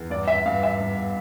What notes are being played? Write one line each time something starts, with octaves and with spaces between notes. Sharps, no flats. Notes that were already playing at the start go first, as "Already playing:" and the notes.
Already playing: E2
G2 D5
E5
G2 F5
E5
G2